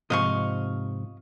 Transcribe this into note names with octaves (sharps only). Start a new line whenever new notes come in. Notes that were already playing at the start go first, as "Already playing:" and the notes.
G#2 C3 F3 D#5 F5 C#6